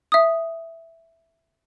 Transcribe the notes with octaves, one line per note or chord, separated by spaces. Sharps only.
E5 D#6